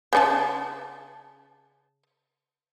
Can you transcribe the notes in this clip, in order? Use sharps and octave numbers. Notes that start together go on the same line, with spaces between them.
C#3 D4 A5